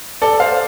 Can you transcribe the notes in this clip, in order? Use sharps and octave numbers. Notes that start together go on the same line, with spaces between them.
A4 D5
C5 F5